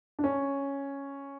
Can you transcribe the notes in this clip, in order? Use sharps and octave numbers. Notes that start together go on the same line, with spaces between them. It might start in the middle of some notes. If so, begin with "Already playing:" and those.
D4
C#4